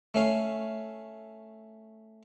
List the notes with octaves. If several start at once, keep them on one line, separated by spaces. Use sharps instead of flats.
A3 C#4 F5